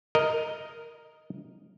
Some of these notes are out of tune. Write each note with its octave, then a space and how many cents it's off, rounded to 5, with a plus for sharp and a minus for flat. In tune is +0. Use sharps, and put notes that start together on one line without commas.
A#4 +0 D#5 +0